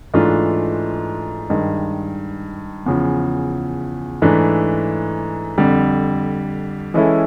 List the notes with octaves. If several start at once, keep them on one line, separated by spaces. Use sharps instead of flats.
G#2 E3 A3 D4 F4
G2 D#3 G#3
E2 C#3 F3
G#2 E3 A3 D4
F2 D3 G3
E3 G#3 C#4 E4 A4